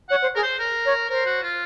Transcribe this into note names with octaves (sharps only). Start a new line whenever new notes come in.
C#5 F#5
C5
G#4 A#4
C5
A#4
C#5
A#4 C5
F#4
F4